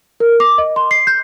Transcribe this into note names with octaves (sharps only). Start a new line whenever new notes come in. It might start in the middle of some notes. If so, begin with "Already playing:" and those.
A#4
D6
D#5
C6
C7
G6